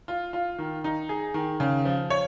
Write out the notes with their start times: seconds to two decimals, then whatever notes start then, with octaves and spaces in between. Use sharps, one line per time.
0.08 F4
0.33 F4
0.58 D#3
0.84 D#4
1.09 G#4
1.34 D#3
1.60 C#3
1.85 F3
2.10 C#5